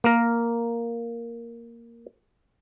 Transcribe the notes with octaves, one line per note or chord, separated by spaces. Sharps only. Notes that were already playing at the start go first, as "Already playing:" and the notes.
A#3 A#4